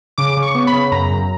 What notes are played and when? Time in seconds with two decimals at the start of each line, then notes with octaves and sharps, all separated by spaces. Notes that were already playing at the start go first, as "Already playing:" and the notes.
0.18 C#3 D6
0.37 C#3
0.43 C#6
0.55 B3
0.67 B5
0.73 C#3
0.92 F#2 A#5
1.10 F#2